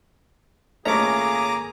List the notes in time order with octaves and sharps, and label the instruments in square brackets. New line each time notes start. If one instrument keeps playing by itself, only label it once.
[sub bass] G#1 [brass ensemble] A#2 G#4 [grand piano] A3 C#4 [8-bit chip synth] A#5 D6